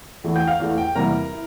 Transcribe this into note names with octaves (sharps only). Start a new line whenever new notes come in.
E2 E3 A3
G5 G6
F5 F6
E2 E3 A3
G5
E2 C3 G3 A#3 E4 A#4 A#5
E4